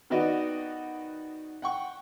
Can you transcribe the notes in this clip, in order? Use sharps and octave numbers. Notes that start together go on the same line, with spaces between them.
D#3 B3 F#4 D5 D#5
F#5 G5 C#6